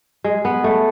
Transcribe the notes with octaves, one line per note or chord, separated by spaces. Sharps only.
G#3
B3
A3